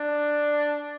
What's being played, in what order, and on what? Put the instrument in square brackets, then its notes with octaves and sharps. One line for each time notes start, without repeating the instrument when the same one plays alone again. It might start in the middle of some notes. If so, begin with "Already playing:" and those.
Already playing: [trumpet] D4